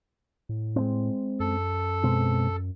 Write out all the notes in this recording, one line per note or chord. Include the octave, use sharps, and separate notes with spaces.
A2
G#3 A3 C4
F#2 A4
B2 G#3 C4